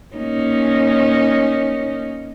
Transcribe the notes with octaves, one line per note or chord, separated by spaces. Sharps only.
A#3 C#4 D#4